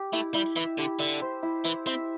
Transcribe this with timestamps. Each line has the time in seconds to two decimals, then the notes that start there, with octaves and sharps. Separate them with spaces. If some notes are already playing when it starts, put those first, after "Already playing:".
Already playing: G4
0.13 A3 E4
0.34 G3 E4
0.56 E3 E5
0.78 D3 G4
0.99 D3 E5
1.22 C5
1.43 E4
1.64 E3 E4
1.87 C4 E5